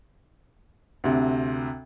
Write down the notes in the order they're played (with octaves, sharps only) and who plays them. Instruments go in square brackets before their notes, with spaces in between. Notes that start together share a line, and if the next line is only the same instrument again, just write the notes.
[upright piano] D2 C3